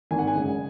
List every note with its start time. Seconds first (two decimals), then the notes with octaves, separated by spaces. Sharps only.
0.11 G#1 G#5
0.19 F#5
0.27 G#5
0.35 F#2 C#3 G#3